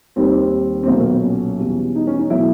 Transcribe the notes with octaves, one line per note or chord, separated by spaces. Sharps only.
D#2 D#3 G3 C4
C4
B1 A#2 F#3 B3
A#3
B3
C#4
E2 B2 G3
D#4
C#4
D#4
B2 F#3 A3 E4